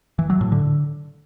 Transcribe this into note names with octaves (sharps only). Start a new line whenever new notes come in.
E3
F#3
A2
D3